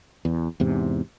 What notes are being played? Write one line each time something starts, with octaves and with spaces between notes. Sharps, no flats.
E2
E2 G#2 C3